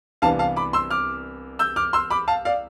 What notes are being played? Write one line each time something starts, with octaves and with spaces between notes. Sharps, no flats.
C2 C3 E3 B3 D4 F5 A5
F5 A5
B5 D6
C6 E6
D6 F6
E6 G6
D6 F6
C6 E6
B5 D6
F5 A5
D5 F5